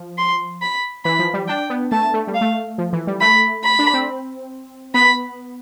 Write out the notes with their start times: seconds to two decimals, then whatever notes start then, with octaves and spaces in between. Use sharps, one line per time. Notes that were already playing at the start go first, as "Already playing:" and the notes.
Already playing: F3
0.18 C6
0.62 B5
1.05 E3 B5
1.19 F3
1.34 G3
1.48 D4 G5
1.70 B3
1.92 A3 A5
2.14 A3
2.27 G3
2.34 F5
2.41 A3
2.78 F3
2.93 E3
3.07 G3
3.21 A3 B5
3.64 B5
3.79 D4
3.94 C4
4.94 B3 B5